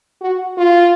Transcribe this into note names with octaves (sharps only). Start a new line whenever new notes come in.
F#4
F4